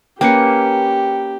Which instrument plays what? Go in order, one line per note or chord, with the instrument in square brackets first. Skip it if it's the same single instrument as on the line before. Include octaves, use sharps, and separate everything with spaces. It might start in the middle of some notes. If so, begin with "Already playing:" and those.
[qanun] A#3 C#4 B4 [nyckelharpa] G4 [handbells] G5 C#7